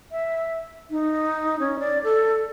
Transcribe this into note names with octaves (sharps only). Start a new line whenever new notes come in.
E5
D#4
C#4
D5
A4